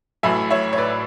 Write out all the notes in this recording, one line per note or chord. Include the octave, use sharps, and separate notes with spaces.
A1 A2 F#3 E5 G#5
C#5 E5
C#5
B4 D5